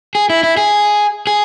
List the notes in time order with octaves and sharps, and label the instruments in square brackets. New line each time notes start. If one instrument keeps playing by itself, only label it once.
[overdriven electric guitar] G#4
E4
E4
G#4
G#4